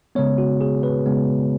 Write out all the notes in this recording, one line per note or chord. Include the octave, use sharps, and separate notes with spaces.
C#3 G#3 B3 C#5
F#4
G#4
B4
C#3 G#3 B3